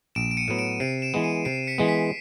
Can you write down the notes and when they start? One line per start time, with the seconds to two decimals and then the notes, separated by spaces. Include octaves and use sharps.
0.15 A#1 D7 E7
0.31 D7
0.37 C#7 D#7
0.48 A2 F#3 B3
0.59 D7 E7
0.80 C3 C7 D7
1.02 D7 E7
1.14 E3 G#3 B3
1.24 C#7 D#7
1.45 C3 C7 D7
1.67 B6 C#7
1.78 E3 G#3 B3
1.89 B6